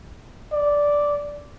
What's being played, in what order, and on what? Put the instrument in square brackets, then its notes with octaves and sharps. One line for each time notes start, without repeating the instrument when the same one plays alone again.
[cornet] D5